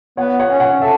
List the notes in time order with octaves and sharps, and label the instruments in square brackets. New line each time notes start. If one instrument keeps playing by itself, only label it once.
[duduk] B3 [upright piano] C#5 F#5
[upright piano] C#5 F#5
[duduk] C#4
[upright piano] C#5 F#5
[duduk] A4 [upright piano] E5